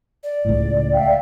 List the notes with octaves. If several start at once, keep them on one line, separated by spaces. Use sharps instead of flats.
D5
C#2 A2
E5 F5 G5